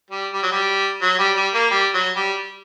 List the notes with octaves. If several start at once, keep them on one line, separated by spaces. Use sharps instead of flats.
G3
G3
F#3
G3
F#3
G3
G3
A#3
G3
F#3
G3